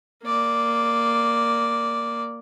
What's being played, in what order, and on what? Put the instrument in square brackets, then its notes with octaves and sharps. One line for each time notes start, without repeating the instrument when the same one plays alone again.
[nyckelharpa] A#3 D5